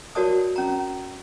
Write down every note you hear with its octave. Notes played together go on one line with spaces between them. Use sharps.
F#4 A#4 C#5 D5 A5 D#6
C#4 A#5